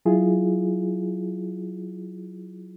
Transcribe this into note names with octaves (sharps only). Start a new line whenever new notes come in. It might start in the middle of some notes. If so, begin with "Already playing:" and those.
F#3 E4 F4 G#4